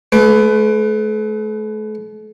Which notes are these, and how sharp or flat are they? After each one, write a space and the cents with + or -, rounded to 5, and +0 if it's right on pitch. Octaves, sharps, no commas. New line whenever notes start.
A3 -40 B4 +20